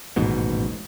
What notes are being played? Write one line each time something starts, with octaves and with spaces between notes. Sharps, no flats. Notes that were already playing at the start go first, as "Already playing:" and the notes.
D#1 A1 G#2 B2